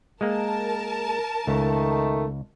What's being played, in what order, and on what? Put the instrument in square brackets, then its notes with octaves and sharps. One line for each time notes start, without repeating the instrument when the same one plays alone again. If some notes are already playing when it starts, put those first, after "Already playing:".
[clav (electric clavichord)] G#3 A#3 [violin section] A#4 A5
[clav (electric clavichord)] C#2 [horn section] D#3 A3